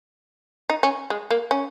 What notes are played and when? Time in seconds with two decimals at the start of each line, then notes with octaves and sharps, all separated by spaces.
0.70 D#4
0.83 C#4
1.10 G#3
1.30 A#3
1.51 C#4